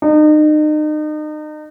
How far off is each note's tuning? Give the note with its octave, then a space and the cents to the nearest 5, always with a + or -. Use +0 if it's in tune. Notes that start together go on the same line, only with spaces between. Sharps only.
D#4 -35